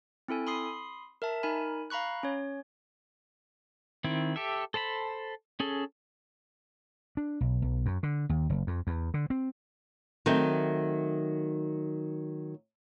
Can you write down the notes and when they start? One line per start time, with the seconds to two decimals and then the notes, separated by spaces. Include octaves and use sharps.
0.28 C4 E4 A4 G#5
0.47 B5 C6 D#6 C7
1.22 A#4 E5 A5
1.43 D#4 A#4 G#5 B5
1.90 F5 A#5 B5 C#6 F#6
2.23 C#4 C#5
4.04 D#3 C4 E4
4.36 G4 A4 E5
4.74 A4 C5 A5 B5
5.60 C#4 G#4 A4
7.17 D4
7.41 B1
7.62 B1
7.86 F#2
8.03 D3
8.29 D#2
8.50 F#1
8.67 F2
8.87 E2
9.14 D3
9.30 C4
10.26 D#3 F#3 A3 C4